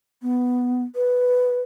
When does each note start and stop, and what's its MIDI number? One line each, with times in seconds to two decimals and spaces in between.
0.22 0.83 59
0.96 1.61 71